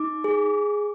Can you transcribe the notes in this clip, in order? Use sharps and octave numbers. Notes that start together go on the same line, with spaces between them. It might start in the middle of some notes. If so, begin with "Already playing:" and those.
Already playing: D#4 D6
G#4